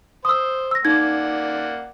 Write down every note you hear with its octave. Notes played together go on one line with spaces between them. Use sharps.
C5 D#6 E6
E6 A#6
A#3 D#4 D5 F#5 G#6